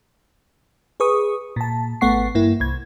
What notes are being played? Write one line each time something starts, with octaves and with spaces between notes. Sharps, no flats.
G#4 B4 C#6 D#6
A#2 A5
G#1 A3 B3 F#5 C#6 C7
G2 A#3 E4
C2 G#6